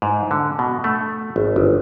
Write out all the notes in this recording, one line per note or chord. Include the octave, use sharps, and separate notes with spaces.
G#2
D3
B2
A3
G#1
G1